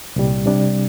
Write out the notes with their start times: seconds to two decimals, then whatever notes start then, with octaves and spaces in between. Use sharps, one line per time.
0.16 C2 A#2 G3
0.46 C3 G3 D4